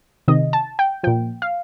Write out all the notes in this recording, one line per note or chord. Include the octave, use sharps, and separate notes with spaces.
C3 D#3 D#5
A5
G5
A#2 F3 G5
F5